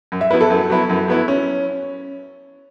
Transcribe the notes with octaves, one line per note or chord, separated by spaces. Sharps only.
F#2
E5
F#3 B3 E4 B4
A4
F#2
F#3 B3 E4
F#2
F#3 B3 E4
C#4